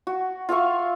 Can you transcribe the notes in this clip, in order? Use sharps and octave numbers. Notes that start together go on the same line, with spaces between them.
F#4
F4 E5 F5 C#6